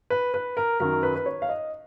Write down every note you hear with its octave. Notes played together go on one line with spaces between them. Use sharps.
B4
B4
A#4
F#2 D#3 F#3 A#4
B4
B4
C#5
F5
D#5